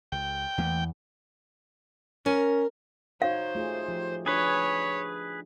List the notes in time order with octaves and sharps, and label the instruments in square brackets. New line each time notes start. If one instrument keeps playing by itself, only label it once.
[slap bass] C#2 [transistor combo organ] G5
[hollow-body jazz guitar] E2 [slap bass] E3 A3 A#3
[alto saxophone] C#4 [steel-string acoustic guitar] A#4
[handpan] D#4 F#4 C#5 [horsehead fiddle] C5 [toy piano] F5
[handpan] A3 F4 G#4
F3 G4
[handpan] D4 [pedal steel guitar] G#4 B4 [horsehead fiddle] C#5